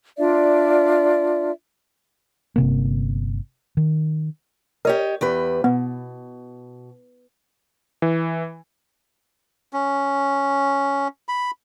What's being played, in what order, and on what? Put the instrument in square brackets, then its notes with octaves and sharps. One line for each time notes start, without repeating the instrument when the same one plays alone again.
[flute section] D4 F4 D5 E5
[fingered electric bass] G1 C3 A#3
D#3
[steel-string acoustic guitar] G4 C#5 D#5 [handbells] A#4
[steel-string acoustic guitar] E2 G4 B4
[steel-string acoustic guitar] B2 [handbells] B3
[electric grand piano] E3
[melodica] C#4
B5